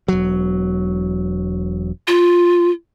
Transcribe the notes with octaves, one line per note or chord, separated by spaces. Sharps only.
E1 F#3
F4